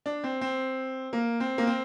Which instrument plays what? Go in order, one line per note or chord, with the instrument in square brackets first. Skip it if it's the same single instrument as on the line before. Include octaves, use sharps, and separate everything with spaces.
[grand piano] D4
C4
C4
A#3
C4
A#3
C4